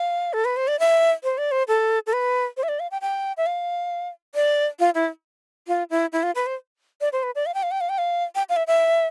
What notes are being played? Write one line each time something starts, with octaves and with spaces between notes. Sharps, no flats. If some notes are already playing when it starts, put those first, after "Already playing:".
Already playing: F5
A4
B4
C5
D5
E5
C5
D5
C5
A4
A4
B4
C5
E5
D5
F5
G5
G5
E5
F5
D5
F4
E4
F4
E4
E4
F4
B4
C5
D5
C5
B4
D5
F5
G5
F5
G5
F5
G5
F5
G5
F5
E5
E5